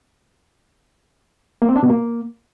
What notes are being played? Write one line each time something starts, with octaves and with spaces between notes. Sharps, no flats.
A#3
C4
D4
B2
A#3